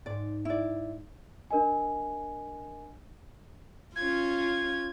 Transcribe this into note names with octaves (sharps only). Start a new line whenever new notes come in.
G#2 D5
E4 D5
D4 A#4 D#5 G#5
C#4 F4 G#6